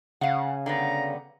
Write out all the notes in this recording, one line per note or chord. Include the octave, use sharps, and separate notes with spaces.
C#3 F5 F#5
D3 G3 B3 A#5